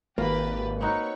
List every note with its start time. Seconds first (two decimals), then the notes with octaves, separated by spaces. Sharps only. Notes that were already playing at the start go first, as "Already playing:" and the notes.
0.18 G#1 A#3 F4 G4 B4 A6
0.81 C4 D#4 F#4 B4 C#5 C#6